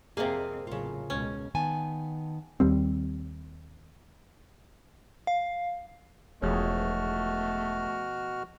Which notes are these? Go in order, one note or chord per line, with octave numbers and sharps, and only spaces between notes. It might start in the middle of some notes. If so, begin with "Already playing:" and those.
F2 C3 A#3 C4 G#4 D#5 F5
A1 C#3 F#3 F4
C#2 B2 C#4
D#3 B3 G#5 A5
D#2 G3 C4
F5
E1 B2 F3 A3 F#4 G#4 C#5 F6